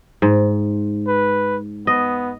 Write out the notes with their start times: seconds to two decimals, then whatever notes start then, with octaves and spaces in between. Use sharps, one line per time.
0.22 G#2
1.08 B4
1.87 B3 D#5